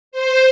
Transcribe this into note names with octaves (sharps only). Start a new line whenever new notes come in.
C5